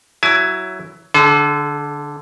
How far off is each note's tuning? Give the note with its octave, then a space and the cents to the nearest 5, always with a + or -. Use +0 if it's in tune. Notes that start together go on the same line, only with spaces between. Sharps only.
F#3 +15 E4 +15 G#5 +35
D3 +0 A4 -45